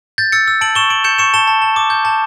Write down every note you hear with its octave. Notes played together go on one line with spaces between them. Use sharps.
G6 A6
E6 A6 C#7
E6
A5 D7 F#7
C#6 E7 G7
C#6 D7 F#7
G6 C#7 E7
C#6 C#7 E7
A5 E7 G7
A5
A5
D6
G6
A5